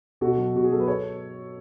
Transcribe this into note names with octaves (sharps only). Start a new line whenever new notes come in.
B2 F#4 A4
F#3
B2 F#4
G#4
F#3 A4
B4
A4 C#5